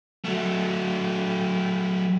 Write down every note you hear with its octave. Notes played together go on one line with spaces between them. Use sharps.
F#3 A3